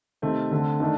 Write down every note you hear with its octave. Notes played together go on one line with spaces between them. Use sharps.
C3 D#3 A3 C4
D3 A3 C4
D#3 A3 D4